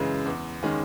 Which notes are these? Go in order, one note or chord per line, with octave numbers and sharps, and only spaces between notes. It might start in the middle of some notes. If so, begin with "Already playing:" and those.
Already playing: F#2 C#3 E3 G#3
E2
D#3 G#3 C#4